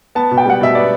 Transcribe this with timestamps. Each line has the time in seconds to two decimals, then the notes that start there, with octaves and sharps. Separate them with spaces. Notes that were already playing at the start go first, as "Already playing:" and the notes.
0.15 B3 A5
0.31 B2
0.38 G5
0.46 G3 F#5
0.61 B2 E5
0.75 B3 D5